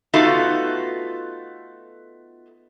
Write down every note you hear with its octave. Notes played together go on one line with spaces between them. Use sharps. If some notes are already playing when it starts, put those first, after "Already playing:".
A3 B3 D#4 F4 F#4 A4